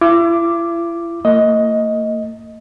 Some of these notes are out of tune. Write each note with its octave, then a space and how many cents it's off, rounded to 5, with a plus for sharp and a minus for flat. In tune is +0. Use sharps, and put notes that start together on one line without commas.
E4 +40 D6 +0
A#3 -45 D#5 +10